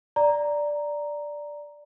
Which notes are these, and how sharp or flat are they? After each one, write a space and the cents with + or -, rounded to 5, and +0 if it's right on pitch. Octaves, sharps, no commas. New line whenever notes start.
D5 +0 A#5 +0